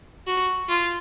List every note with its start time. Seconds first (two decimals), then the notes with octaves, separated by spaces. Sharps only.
0.27 F#4
0.69 F4